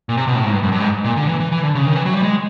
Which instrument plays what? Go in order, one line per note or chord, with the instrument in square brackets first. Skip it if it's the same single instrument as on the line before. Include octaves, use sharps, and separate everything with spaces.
[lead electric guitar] A#2
C3
B2
A2
G#2
G2
F#2
G2
G#2
A#2
D3
E3
E3
E3
D3
C#3
D#3
E3
F#3
G3
G#3